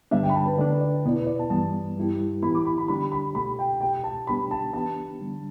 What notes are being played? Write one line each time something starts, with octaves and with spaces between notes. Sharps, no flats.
G2 D3 G3 B3 D4 E5
G5
B5
A5
B4
D3 A3 D4 D5
B4
D5
E2 B2 B3 E4 D5
B4
D5
A5
G2 E3 G3 B3 A5
G2 G3 E4 G4
A2 E3 B3 E4 G4 B5
D6
B5
B5
D3 G3 D4 G4 B5
B5
B2 A3 G4 B5
G5
E2 B2 A3 G4 G5
A5
B2 G3 B3 D4 G4 B5
A5
E3 B3 D4 G4 A5
D3 G3 D4